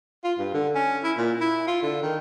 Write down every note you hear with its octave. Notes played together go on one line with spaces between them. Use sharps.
F4
G2
D3
C#4
E4
A#2
E4
F4
D3
D#3